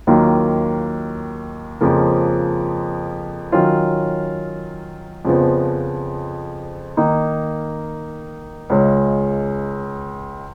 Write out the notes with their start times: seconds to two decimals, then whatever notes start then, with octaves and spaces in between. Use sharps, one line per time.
0.07 D#2 D#3 F#3 A#3 F4
1.81 F2 C#3 F3 A#3
3.52 D#3 F#3 C#4 F4
5.25 F2 C#3 F3 B3
6.97 D#3 A#3 D#4
8.70 C#2 C#3 G#3 C#4